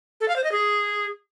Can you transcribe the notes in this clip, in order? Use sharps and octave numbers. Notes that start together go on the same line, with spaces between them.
A4
F5
C5
D#5
G#4